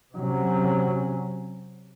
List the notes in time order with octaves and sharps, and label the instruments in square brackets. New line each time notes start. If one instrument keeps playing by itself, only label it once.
[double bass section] C3 F#3 C#4